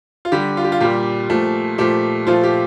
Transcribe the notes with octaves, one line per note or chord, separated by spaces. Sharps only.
F4
D3 G3 G4
F4
G4
F4
A#2 G3 G4
A#2 F3 A3
A#2 F3 A3 G4
A#2 F3 A3 F4
G4